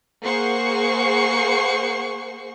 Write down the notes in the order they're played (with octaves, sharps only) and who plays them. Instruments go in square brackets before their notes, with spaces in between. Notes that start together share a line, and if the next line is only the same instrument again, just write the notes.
[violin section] A#3 G#4 C5 F#5 C#6 C7